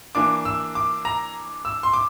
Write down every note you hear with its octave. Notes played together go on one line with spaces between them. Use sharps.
E3 A#3 D4 D6
E6
D6
A#5
E6
C6
D6